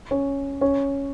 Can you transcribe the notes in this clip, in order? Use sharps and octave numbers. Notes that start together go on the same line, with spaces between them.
C#4
C#4